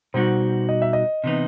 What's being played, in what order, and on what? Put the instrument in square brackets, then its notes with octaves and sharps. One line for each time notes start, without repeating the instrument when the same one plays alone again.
[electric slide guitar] B2 G3 D#4 F#4 [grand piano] C5
[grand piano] D#5
E5
D#5
[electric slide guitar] C3 E3 B3 D#4